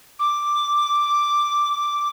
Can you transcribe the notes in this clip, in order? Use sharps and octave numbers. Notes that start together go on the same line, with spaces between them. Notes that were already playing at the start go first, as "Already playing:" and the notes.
D6